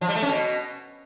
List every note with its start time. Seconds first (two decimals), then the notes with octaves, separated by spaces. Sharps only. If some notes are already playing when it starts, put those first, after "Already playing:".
0.01 F3
0.08 G3
0.15 A3
0.22 C#4
0.29 B2